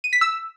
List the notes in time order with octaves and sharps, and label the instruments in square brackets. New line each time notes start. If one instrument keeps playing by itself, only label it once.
[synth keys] D#7
B6
E6